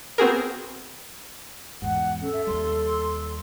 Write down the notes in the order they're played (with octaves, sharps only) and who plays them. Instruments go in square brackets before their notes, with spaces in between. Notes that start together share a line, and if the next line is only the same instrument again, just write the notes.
[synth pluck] B3 C4 F#4 G#4 A#4
[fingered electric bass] E2 G#2 [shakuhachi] F#5
[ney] C#4 [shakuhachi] A4
[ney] E5
[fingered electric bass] D#2 G3 [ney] C6